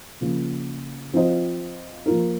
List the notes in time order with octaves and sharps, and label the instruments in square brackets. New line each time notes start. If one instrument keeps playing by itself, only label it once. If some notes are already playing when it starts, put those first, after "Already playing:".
[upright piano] C#3 F3 A#3
F3 C4 F4 C5 D#5
F3 A#3 F4 A#4